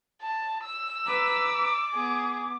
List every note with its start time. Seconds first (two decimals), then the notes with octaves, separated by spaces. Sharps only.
0.22 A5
0.64 E6
1.07 B4 A#5 D6
1.95 B3 G#4